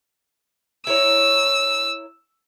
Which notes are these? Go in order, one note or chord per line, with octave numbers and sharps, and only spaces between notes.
E4 A#4 C#5 E6